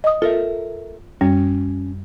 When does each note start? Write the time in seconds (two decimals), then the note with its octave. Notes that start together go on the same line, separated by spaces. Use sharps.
0.04 D#5 D#6
0.22 F4 A4 A#4 E5
1.21 F#2 G3 C#4